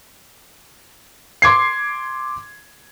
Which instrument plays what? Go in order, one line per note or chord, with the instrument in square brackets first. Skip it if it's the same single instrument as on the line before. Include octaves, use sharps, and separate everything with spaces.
[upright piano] C6 D6 G#6 C7